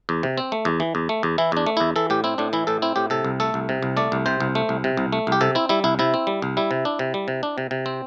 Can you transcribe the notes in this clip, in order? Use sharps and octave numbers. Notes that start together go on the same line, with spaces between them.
E2
C3
C4
A3
E2
E3
E2
A3
E2
E3 E4
E2 D4
A3
E2 E4
E3 A4
A2 G4
C4 E4
A2 D4
E3 E4
A2 A4
C4 E4
A2 G4
C3 A4
C2
A3 A4
C2
C3
C2
A3 D5
C2
C3 C5
C2
A3
C2
C3
C2
A3
C2 G4
C3 A4
C4 E4
G3 E4
C2 E4
C3 E4
C4
G3
C2
G3 E4
C3
D4
C3
G3
C3
D4
C3
C3
C4